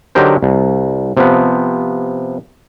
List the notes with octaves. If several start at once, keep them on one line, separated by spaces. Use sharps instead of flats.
D3 F#3 D#4 G4 A#4 C5
C2
C3 F3 B3